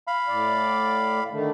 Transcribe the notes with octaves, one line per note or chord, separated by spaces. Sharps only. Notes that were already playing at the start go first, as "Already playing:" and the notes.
F5 B5
A2 D5
D3 D#3 A3